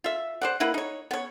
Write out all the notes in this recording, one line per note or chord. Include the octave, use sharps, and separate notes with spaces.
F4 E5
C5 D5 F#5
A#3 E4 B4 F#5
D#4 C#5
B3 C#5